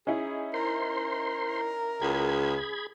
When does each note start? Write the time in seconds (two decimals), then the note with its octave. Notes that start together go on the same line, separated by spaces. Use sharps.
0.07 C#4 D#4 E4 G#4
0.54 A#4 C5 C6
2.02 C#2 G#4 B5 G#6